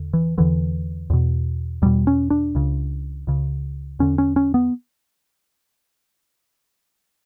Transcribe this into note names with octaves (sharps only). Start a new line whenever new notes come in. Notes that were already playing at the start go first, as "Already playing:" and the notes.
Already playing: E2 D3
E3
E2 D3 E3
E2 B2
E2 B2 G3
C#4
D4
C#2 C#3
C#2 C#3
E2 D3 C#4
C#4
C#4
B3